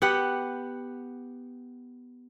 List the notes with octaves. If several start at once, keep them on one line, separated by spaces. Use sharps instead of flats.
B3 G4 F#5